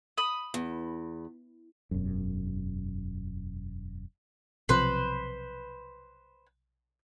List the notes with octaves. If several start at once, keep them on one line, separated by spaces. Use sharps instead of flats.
B5 D#6
E2
E1 F#2
B1 C3 F3 B4 C5